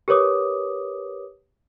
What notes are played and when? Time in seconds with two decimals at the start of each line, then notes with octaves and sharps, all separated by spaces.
0.08 G4 A#4 B4 C#5 D6 D#6